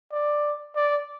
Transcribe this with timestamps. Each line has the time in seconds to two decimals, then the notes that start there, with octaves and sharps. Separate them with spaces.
0.12 D5
0.76 D5